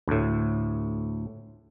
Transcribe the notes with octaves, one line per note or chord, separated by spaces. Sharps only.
D2 A2